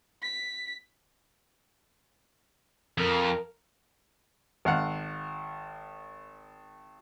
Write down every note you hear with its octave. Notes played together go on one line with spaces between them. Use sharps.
B6
F2 A#4
G#1 F5 F#5